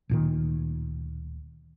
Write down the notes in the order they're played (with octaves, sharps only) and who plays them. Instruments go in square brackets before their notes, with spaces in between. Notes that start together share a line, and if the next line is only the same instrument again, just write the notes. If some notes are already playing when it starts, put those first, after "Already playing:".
[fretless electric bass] D1 A#2 D#3